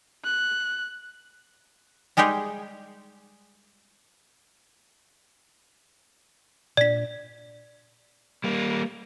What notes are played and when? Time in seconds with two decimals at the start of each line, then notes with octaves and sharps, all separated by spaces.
0.25 F#6
2.17 G3 G#3 D#4 G4 G#4
6.77 A#2 D4 D5 B6
8.44 G3 A#3